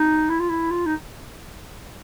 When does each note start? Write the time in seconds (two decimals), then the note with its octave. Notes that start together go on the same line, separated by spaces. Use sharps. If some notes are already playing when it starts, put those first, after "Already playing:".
Already playing: D#4
0.30 E4
0.39 F4
0.49 E4
0.70 F4
0.86 D#4